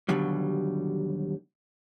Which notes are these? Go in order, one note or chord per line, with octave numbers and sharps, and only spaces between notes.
D#2 B2 D3 F#3 G3